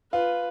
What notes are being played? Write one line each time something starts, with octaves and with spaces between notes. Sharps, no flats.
F4 B4